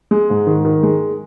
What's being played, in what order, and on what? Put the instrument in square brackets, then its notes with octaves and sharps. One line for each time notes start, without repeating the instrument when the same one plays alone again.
[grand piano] G#3
G#2
D#3
D#3
G#3